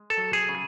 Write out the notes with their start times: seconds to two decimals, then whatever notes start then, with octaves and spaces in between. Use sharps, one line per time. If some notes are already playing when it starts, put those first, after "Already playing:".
Already playing: G#3
0.10 A4
0.17 F#3
0.33 G#4
0.49 C#3